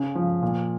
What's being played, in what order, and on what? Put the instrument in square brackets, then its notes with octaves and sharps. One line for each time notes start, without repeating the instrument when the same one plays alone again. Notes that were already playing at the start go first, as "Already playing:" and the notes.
Already playing: [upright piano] C#3
F3
A#2